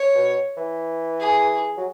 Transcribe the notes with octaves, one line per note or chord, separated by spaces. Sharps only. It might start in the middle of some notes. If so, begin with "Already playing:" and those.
Already playing: C#5
B2
E3
G#4
F#3